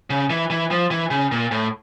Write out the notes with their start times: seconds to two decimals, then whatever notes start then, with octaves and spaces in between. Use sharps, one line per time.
0.10 C#3
0.30 E3
0.50 E3
0.71 F3
0.91 E3
1.11 C#3
1.32 A#2
1.51 A2